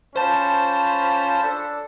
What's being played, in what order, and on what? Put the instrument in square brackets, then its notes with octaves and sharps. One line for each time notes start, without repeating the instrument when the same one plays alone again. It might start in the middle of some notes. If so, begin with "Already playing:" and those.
[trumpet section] C#4 F4 B5 [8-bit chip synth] C5 A5
[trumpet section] D4 A4